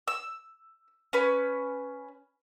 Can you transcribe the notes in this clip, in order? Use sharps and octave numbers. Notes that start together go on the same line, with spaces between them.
E6
C#4 B4